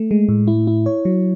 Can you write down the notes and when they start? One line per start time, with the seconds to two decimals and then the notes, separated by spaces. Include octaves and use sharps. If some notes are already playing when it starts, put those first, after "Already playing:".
Already playing: A3
0.11 G#3
0.29 A2
0.47 E4
0.67 E4
0.86 C#5
1.05 F#3